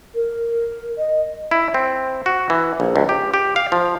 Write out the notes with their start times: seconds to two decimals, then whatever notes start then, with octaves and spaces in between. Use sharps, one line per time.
0.15 A#4
0.98 D#5
1.51 E4
1.74 C4
2.26 F#4
2.50 E3
2.80 A#1
2.96 C#2
3.09 G4
3.34 G4
3.56 F5
3.72 F3